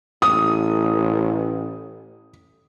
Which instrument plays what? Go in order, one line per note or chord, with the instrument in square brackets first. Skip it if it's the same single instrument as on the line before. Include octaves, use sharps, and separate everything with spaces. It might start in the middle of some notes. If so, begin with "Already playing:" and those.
[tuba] A1 [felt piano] D#6